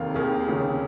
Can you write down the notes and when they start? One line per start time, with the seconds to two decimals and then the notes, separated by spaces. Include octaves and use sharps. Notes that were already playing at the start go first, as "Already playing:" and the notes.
Already playing: F1 D#2 D#3 F5
0.14 F1 D#2 D#3 G#4
0.47 F1 D#2 C#3